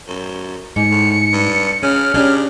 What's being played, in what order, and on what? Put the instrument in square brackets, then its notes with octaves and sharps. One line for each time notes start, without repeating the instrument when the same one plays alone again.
[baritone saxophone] F#2
[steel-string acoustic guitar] G#2 [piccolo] C#7
[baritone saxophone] A2
G2
[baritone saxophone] C#3 [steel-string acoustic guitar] C#4 [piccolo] F6
[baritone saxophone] C#3 [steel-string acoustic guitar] C#4 D4 G4